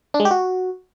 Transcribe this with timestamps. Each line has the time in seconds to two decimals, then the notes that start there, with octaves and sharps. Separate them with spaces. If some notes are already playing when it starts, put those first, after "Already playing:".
0.14 D4
0.20 G#3
0.25 G4
0.31 F#4